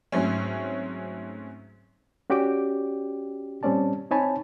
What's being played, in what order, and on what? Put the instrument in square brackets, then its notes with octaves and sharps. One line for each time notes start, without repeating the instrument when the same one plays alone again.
[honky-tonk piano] G#2 F#3 A3 C4 C#4
[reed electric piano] C#4 F#4 G4 D5 G5 D6
A#2 G3 C4 C#4 D5 A5
C4 D#4 C#5 G#5 A5 B5